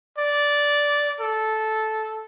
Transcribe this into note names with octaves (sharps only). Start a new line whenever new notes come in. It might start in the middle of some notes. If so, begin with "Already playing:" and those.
D5
A4